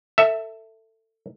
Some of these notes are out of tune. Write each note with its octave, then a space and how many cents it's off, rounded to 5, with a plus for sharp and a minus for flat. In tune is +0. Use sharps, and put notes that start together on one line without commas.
A4 +25 E5 +0